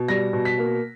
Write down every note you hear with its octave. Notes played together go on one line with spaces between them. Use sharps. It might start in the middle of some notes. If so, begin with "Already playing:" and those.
Already playing: B2
G3 A#6
B2
B6
A#3